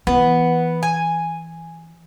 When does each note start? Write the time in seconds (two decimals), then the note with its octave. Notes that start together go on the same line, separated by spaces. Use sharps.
0.07 E3 B3
0.83 G#5